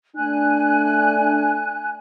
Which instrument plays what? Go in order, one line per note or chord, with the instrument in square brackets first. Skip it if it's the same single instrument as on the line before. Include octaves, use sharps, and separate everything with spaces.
[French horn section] A3 D4 [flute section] G#5 F#6